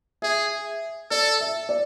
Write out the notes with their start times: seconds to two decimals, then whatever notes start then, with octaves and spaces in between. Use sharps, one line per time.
0.22 G#4 E5
1.11 A4 D5
1.41 E5
1.69 D5